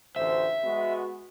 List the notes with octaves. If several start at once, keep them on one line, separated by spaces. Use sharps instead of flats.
A1 D2 C5 E5
G#3 B3 F#4